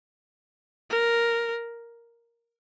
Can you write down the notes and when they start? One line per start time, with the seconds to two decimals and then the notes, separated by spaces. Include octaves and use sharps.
0.90 A#4